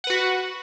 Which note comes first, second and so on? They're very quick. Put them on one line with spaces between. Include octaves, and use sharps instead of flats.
F#5 B4 F#4